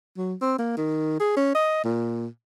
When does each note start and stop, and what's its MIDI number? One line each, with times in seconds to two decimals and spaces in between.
0.17 0.34 54
0.41 0.56 60
0.59 0.76 58
0.77 1.19 51
1.20 1.36 68
1.37 1.53 61
1.55 1.82 75
1.84 2.27 46